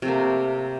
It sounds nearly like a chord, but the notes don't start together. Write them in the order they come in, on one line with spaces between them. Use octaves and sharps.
C3 A3 A#3